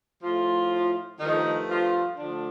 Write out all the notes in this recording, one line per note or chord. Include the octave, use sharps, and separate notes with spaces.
A2 F3 A3 F4
G2 D#3 F3 A3 D#4
F3 F4
D3 F3 A3 D4